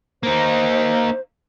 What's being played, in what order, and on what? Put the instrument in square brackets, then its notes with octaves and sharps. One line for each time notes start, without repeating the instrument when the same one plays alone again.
[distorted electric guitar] A#3 D#4 [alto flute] C5